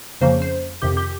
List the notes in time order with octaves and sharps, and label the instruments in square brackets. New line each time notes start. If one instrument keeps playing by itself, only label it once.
[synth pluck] F2 C#3 F3 A#3 C#4 C5
C5
F2 C3 D#3 G4
G4